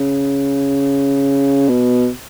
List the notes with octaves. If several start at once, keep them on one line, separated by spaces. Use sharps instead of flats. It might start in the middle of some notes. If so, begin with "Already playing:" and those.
Already playing: C#3
B2